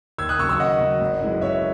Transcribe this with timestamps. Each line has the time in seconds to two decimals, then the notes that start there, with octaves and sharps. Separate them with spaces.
0.18 D#2 E6 G#6
0.29 D#6 F#6
0.39 C#3 C#6 E6
0.43 F#3
0.49 C#6 E6
0.59 D#2 D#5 F#5
0.80 C#3 F#3
1.00 G#1
1.21 F#2 E3 G#3
1.41 G#1 C#5 E5